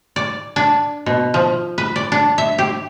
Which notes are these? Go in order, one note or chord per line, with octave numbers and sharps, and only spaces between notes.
D5
D4
B2
F3
B4
D5
D4
E5
G4